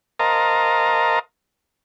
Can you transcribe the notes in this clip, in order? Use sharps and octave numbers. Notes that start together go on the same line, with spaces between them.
A#4 C5 D#5 F5 A5 A#5